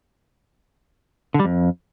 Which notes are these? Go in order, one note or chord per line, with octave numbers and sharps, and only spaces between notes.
D3
G3
F2